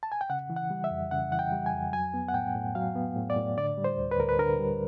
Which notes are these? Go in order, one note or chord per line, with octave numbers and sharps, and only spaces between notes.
A5
G#5
G5
C#3 F#5
E3
F#5
G3
E5
F2
C#3 F#5
E3 F#5
G5
G3
G#5
F2
F#3 G#5
B3
F#5
A2 G5
A2
F#3 F5
B3
A2
D5
A2
D3 D5
G3
C5
D2
B4
D2 A#4
B4
D3 A#4
G3